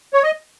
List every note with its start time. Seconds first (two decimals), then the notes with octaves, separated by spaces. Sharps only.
0.14 C#5
0.23 D#5